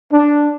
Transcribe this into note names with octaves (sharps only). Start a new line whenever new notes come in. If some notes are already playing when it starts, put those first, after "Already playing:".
D4